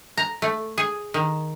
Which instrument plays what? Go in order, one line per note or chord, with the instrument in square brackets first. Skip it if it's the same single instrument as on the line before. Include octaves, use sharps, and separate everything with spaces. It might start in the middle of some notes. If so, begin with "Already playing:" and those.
[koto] A#5
A3
G#4
D#3